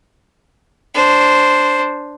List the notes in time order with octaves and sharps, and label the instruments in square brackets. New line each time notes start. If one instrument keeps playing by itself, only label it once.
[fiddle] D4 C5